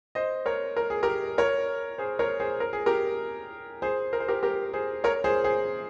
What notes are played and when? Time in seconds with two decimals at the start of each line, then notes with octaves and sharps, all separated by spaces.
0.15 C5 D#5
0.46 A#4 C#5
0.77 A#4
0.90 G#4
1.03 G4 A#4
1.38 A#4 C#5
1.98 G#4 C5
2.19 A#4 C#5
2.40 G#4 C5
2.60 A#4
2.73 G#4
2.86 G4 A#4
3.82 G#4 C5
4.13 A#4
4.20 C5
4.28 G4 A#4
4.43 G4 A#4
4.73 G#4 C5
5.04 A#4 C#5
5.24 G#4 C5
5.44 G#4 C5